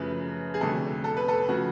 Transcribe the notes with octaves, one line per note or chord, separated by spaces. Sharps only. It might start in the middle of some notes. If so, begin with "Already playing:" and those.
Already playing: F#2 C#3 F3 A3 B4
G#4
F1 F2 D3 F#3 A3 A4
A4
B4
A4
C#3 F3 A3 F#4